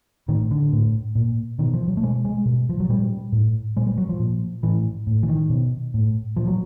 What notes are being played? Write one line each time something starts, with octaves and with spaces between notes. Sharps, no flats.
A2 D#3
D3
A2
A#2
B2 D#3
F3
F#3
A3
B2 G#3
G#3
B2
F3
F#3
A#2 G3
A2
A#2 G#3
G3
F#3
F3
A#2
A2 E3
A2
E3
D#3
B2
A2
A#2 F3
F#3